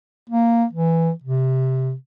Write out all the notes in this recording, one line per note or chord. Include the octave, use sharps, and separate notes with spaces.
A#3
E3
C3